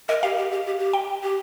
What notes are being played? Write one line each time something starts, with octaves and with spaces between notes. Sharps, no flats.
A#4 D#5
G4 F5
G4
G4
G4
G4
G5
G4